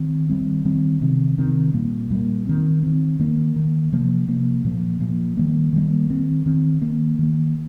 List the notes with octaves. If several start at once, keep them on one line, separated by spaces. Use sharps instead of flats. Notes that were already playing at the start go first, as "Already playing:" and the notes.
Already playing: D#3 C4
D#3 G3 C4
D#3 G3 C4
C3 D#3 C4
C3 D#3 C4
A#2 G3 A#3
A#2 G3 A#3
D#3 C4
D#3 C4
D#3 A#3
D#3 A#3
C3 F3 A#3
C3 F3 A#3
A#2 F3 A#3
A#2 F3 A#3
D#3 G3 A#3
D#3 G3 A#3
D#3 C4
D#3 C4
D#3 A#3
D#3 A#3